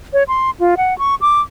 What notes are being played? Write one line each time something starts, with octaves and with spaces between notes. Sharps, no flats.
C#5
C6
F4
F#5
C#6
D6